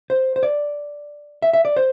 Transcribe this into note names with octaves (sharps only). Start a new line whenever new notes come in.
C5
C5
D5
E5
E5
D5
C5